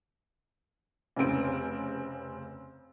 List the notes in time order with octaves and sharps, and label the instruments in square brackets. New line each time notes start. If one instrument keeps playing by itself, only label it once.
[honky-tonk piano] F1 C#3 C4 D7